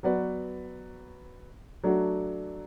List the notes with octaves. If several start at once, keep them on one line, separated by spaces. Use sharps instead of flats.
F#3 B3 F#4 B4 D5
F#3 A3 D4 F#4